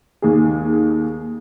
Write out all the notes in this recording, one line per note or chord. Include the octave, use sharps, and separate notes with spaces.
D#2 G#4